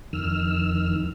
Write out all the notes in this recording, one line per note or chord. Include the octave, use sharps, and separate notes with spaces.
F2 D#3 E6 F6